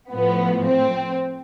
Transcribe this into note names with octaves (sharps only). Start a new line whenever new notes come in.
A2 F3 B3
C4